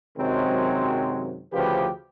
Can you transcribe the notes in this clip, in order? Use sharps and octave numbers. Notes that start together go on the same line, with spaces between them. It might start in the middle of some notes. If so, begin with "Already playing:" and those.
F#2 C3 D#3 F#3 G#3 C4
D2 C#3 F3 G4 B4